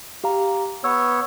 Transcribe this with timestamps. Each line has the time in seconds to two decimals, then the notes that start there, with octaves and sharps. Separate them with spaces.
0.24 G4 F5 A#5
0.84 B3 C#5 E6